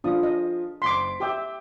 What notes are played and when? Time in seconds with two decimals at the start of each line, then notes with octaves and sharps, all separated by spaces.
0.04 F3 D4 F4 D#6
0.23 D#5
0.82 F#1 C6 D6 B6
1.20 G4 E5 G5 D6 G6